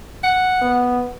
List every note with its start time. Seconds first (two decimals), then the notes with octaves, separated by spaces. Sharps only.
0.24 F#5
0.62 B3